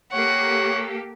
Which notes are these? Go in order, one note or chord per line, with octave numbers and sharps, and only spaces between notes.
A#3 G4 A4 C#5 F#5